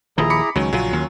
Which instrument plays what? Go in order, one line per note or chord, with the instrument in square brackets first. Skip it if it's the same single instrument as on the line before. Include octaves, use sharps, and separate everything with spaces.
[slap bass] D#1 D#2 F3 [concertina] E4 G#4 A#5
[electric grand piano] B5 D6 C#7
[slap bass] C#2 D#3 [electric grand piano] F#3 [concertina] C#4
[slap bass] A#1 C#3 [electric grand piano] F#3 F4
[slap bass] D#2